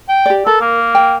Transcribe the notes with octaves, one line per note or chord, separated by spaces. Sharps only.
G5
G4 D5
A4 A#4
A#3
G5